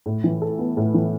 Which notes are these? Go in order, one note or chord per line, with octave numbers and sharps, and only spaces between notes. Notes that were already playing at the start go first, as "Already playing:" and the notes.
A2
E3
A4
B3
A2
E3